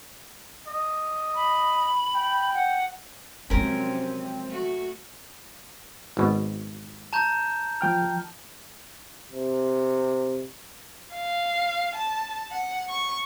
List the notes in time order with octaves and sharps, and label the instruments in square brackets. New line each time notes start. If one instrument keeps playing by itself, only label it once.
[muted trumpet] D#5
[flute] B5
[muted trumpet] G5
[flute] F#5
[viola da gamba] F#2 C3 [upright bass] F3 G#3 [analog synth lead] C4 [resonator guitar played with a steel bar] C#4 A#4
[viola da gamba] A3 F#4
[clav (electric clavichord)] G#1 B2
[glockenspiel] A5 A#5 G6
[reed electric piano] F3 G5 F6
[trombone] C3
[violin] F5
A5
F#5
C#6